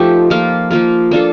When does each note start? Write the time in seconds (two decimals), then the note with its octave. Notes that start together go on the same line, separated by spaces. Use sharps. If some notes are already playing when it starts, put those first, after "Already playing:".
Already playing: F3 A3 D#4 G4
0.30 F3 A#3 F4 A#4
0.71 F3 A#3 F4 A#4
1.11 A#3 D4 F4 A4